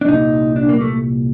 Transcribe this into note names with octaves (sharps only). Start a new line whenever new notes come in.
D4
C2 A#2 D#4
D4
A#3
A3